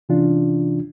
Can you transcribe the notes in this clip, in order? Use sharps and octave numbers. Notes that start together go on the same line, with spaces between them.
C3 E3 C#4 D4 F4